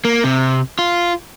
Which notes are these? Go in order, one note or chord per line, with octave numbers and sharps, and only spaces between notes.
A#3
C3
F4